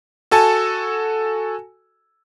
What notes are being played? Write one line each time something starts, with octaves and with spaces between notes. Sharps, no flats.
F#4 A4 G#5 A5